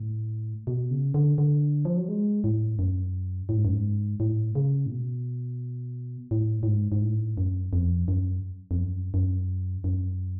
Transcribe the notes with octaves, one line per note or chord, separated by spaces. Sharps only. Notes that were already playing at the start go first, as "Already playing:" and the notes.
Already playing: A2
B2
C#3
D3
D3
F3
F#3
G#3
A2
F#2
A2
G#2
F#2
G#2
A2
C#3
A2
B2
A2
A2
G#2
G#2
A2
F#2
F2
F#2
F2
F#2
F#2
F#2